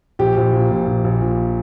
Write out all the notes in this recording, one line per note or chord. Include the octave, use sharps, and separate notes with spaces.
A#1 G4
A#1
A#2
A#1
A#1
A#1
A#2